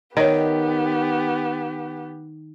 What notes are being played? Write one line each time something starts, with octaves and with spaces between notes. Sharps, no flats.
D#3 B3 G4 A#4 C#5